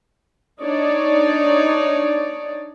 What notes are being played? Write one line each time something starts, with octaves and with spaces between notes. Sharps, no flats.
D4 D#4 C#5 D5